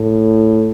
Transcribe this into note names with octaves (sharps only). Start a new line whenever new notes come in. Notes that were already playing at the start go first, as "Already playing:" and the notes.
Already playing: A2